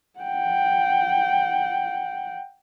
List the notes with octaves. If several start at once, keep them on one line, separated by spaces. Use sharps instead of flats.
F#5 G5